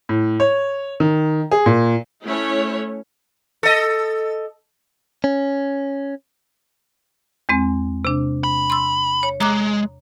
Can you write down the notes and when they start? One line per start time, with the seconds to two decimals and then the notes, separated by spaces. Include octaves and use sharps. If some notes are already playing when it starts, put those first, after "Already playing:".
0.09 A2
0.40 C#5
1.00 D#3
1.51 G#4
1.66 A#2
2.23 A3 C#4 E4 C#5
3.63 A4 D#5
5.24 C#4
7.49 E2 G#3 C4
8.05 C3 D4
8.44 B5
8.70 C6 E6
9.23 C#5
9.41 G#3 A#5 D6 F#6